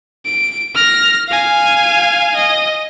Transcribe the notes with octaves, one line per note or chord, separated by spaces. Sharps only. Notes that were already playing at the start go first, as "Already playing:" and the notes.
D7
F6 A#6
F5 G#5
D#5